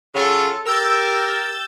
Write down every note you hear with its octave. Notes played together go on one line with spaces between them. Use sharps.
C#3 F#3 F4 A4
G4 A#4 E6 G6 A6